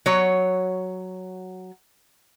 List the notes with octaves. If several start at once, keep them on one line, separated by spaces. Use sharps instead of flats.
F#3 C#5